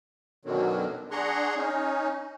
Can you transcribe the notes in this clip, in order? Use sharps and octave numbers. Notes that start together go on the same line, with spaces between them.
F#2 B2 D3 D#3 F#3
D4 G#4 F#5 A#5 C6 C#6
C#4 D#4